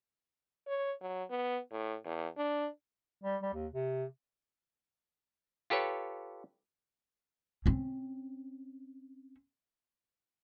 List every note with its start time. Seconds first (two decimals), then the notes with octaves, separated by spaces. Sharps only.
0.67 C#5
1.01 F#3
1.30 B3
1.72 A2
2.05 E2
2.37 D4
3.24 G3
3.43 G3
3.54 D#2
3.73 C3
5.70 F4 G4 A4 B4 C#5
7.66 C4 C#4